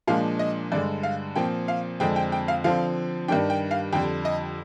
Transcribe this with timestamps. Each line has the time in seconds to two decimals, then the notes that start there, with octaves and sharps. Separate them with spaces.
0.07 A#2 F3 G#3 D4 F5
0.39 D#5
0.72 G2 D3 G#3 D5
1.03 F5
1.36 A#2 F3 C4 G5
1.68 F5
2.00 F2 D3 G#3 C4 G5
2.16 G5
2.32 G5
2.48 F5
2.64 D3 F3 C4 F5
3.28 G2 D#3 G3 D4 G5
3.50 G5
3.71 F5
3.93 F2 D3 G3 G5
4.25 D#5